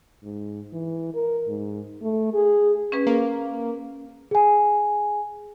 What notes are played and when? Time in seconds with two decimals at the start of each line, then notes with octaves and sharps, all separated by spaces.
0.24 G#2
0.72 E3
1.14 A#4
1.48 G#2
2.02 A3
2.34 G#4
2.92 C#4 G#4 B4
3.07 A#3
4.31 G#4 G#5